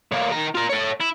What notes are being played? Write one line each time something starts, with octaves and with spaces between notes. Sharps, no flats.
A2 A#3
D#3 A#5
F4 A#4
A4 C#5
E4